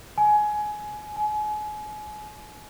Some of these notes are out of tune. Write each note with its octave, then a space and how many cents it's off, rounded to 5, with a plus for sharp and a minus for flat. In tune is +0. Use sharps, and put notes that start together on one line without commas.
G#5 +20
G#5 +35